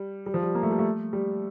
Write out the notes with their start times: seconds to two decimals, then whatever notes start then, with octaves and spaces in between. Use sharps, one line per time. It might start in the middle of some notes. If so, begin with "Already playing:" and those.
Already playing: G3
0.26 G3
0.34 F3
0.43 G3
0.55 A#3
0.63 A3
0.71 G3
0.79 A3
1.13 G3